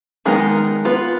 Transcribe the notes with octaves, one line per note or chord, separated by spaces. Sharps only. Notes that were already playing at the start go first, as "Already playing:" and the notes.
D#3 G#3 B3 D#4 A#4
B3 F4 B4